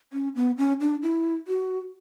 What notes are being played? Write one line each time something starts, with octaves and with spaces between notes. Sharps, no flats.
C#4
B3
C#4
D4
E4
F#4